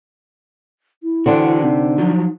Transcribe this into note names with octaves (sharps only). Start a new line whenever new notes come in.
E4
D3 E3 C4 D4 F#4
C3 D#4
F3 F#3